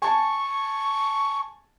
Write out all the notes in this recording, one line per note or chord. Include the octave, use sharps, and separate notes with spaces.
G#5 A5 C#6